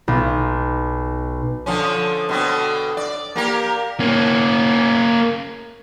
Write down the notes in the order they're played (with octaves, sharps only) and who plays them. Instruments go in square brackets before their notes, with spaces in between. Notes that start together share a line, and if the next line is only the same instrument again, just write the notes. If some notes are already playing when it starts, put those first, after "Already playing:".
[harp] B1
[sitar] D3 F3 C#4
B2 D3 C4
D5
A#3 G4 A#4
[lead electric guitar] A#3 C#4